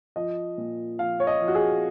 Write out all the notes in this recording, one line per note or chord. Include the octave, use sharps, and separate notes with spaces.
F3 D#5
A#2
F3 F5
C#5
D#5
F3
F#4
G#4